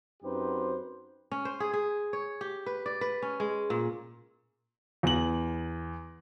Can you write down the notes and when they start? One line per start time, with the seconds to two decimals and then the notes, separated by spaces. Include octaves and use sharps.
0.23 F#2 C4 D#4 G4 B4 C5
1.31 C#4
1.45 C5
1.60 G#4
1.73 G#4
2.13 C#5
2.41 G4
2.66 B4
2.86 D5
3.01 B4
3.22 C#4
3.40 G#3
3.70 A#2
5.03 E2 F#7